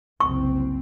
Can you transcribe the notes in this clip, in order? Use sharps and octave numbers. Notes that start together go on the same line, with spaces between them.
F#1 C2 C4 C#6